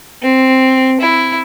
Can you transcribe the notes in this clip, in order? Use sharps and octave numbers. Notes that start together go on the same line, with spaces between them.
C4
E4